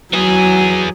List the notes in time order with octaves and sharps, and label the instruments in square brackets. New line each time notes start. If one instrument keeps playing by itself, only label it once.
[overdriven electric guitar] E3 G#4 [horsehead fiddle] F#3